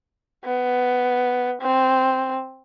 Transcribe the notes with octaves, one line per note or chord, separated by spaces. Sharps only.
B3
C4